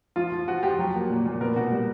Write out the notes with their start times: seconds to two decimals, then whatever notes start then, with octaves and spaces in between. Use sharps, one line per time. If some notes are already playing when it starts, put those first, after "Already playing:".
0.16 F3 F4
0.32 F3
0.48 F3 F#4
0.63 F3 G4
0.79 F#3
0.95 A#3
1.10 A#2
1.25 A#2
1.41 B3 A#4
1.56 B2 F#4
1.72 G3